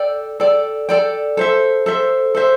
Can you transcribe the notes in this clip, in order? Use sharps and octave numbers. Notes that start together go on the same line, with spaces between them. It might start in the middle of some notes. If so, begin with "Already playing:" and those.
Already playing: A4 D5 G5
A4 D5 G5
A4 D5 G5
A4 C5 E5
A4 C5 E5
A4 C5 E5